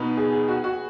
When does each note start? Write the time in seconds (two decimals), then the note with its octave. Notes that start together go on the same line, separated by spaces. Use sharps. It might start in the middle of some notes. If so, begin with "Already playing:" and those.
Already playing: B2 B3 D#4 B4
0.17 G#4
0.32 G#4
0.48 F#4
0.64 F#4